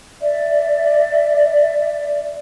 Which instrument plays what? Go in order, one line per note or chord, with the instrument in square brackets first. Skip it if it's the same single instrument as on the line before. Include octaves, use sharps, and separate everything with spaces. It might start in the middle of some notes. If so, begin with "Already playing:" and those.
[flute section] D5 E5